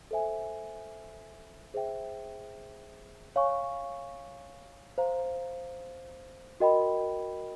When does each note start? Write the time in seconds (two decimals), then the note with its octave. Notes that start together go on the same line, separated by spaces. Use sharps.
0.11 A4 C5 E5 G#5
1.74 G#4 C5 E5 G5
3.36 C#5 F5 G#5 C#6
4.98 C5 F5 A#5
6.60 F#4 A#4 D#5 G5 B5